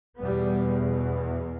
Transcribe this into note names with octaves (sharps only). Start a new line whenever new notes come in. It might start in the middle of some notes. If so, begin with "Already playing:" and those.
E2 B2 G3 B3